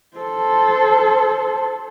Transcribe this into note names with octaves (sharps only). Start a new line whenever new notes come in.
A4 C5